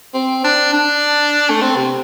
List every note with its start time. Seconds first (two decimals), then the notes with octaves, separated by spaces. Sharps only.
0.14 C4
0.45 D4
0.73 D4
1.50 A3
1.61 C4
1.76 C3